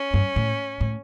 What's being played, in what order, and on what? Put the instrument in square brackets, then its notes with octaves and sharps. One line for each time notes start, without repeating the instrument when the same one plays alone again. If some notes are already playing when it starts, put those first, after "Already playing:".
Already playing: [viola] C#4
[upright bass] G2
A2
A2